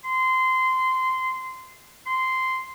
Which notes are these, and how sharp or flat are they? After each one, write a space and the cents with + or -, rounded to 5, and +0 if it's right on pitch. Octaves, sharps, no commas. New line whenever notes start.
C6 -15
C6 -10